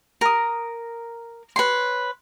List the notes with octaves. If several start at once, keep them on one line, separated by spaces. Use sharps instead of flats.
A#4 D#6
B4 C#5 C6